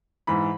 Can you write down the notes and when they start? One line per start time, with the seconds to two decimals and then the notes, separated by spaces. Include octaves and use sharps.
0.27 G#2 E3 B5